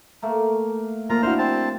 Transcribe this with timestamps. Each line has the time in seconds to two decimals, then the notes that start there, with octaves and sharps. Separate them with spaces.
0.22 A3 A#3
1.10 F3 A#3 F4 A#5
1.22 D4 E4 F#4 C5 F6
1.38 C4 A5